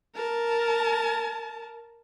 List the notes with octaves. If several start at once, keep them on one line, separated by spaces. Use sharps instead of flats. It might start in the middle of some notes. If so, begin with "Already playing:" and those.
A#4 A5